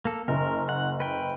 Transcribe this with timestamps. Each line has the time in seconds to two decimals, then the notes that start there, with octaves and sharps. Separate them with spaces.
0.05 A#3 A4
0.28 F#1 A#4
0.69 F#5
1.00 B4 G5